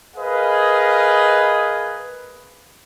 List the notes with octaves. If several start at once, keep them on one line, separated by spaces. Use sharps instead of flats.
G#4 A#4 B4 D#5 F5